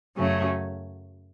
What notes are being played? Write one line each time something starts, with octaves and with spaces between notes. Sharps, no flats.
F#2 C#3 F#3 A3 C#4